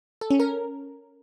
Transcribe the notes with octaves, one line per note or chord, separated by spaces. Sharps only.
A4
C#4
A#4